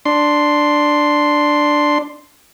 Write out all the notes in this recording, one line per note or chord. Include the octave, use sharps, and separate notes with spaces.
D4 C6